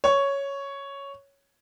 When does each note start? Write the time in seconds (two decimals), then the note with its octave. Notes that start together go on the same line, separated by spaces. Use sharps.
0.04 C#5 C#6